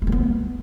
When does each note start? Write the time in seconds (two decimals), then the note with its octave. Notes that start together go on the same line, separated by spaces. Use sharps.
0.02 A3
0.07 G#3
0.12 B3